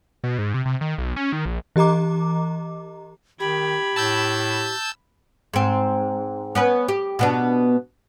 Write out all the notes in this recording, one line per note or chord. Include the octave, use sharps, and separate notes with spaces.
B2
G#2
C3
C3
D#3
B1
C#4
D#3
A#1
E3 G4 D#5 A#5 D6
D#3 G4 B5 G#6
A2 A5 E6 G6
G#2 C4
B3 C#4 B4
G4
B2 B3 D4